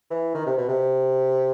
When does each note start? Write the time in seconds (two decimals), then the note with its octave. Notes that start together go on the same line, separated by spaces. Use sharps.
0.10 E3
0.35 D#3
0.46 C3
0.58 B2
0.68 C3